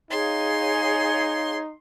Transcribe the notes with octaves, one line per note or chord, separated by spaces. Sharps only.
D#4 G#4 C#5 F5 C6